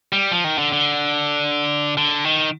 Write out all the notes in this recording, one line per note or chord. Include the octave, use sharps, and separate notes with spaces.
G3
F3
D#3
D3
D3
D3
D#3